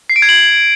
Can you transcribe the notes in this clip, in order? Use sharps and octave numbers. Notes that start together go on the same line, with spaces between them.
C7
D7
G#6
F#7